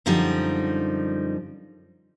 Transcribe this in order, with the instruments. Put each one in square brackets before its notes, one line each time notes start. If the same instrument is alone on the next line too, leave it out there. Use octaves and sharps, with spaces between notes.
[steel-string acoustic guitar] F#2 D3 F3 G3 D#4